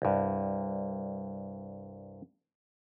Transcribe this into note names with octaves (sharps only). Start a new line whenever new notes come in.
C2 G2